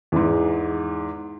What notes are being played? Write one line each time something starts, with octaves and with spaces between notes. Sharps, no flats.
E2 G#2